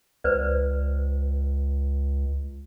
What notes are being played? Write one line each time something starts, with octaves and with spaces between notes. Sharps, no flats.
C#2 B4 C5 D5